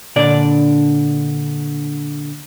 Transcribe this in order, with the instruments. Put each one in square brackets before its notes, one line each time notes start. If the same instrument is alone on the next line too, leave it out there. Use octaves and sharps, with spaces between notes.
[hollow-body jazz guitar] A#2 D3 D4 D5